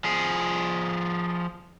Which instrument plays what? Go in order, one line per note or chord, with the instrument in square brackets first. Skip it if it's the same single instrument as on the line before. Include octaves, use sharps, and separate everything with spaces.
[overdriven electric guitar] F3 G#4